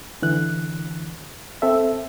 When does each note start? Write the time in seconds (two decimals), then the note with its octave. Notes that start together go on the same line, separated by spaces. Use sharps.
0.22 D3 E3 F#6
1.62 C4 A4 E5